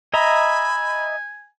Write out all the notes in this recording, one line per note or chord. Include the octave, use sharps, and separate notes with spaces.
D#5 E5 G#5 A#5 B5